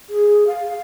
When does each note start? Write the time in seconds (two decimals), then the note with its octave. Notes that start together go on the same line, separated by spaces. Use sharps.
0.10 G#4
0.47 F5